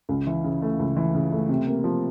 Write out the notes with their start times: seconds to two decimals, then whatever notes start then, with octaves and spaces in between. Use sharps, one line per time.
0.09 C#2
0.27 E3
0.44 C#3
0.62 A3
0.79 C#2
0.97 E3
1.15 C#3
1.32 A3
1.49 C3
1.67 A#3
1.84 F3